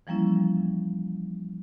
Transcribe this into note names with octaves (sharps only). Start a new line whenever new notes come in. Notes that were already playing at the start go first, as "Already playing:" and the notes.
E3 F3 G3 A#3 C#4 E4